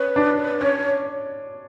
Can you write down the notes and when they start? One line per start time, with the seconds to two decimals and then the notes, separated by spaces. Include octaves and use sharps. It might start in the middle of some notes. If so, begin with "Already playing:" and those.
Already playing: C#4 B4
0.16 D4
0.61 C#4 C#5